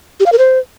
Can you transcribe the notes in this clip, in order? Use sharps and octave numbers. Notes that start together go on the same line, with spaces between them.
G4
F5
A#4
C5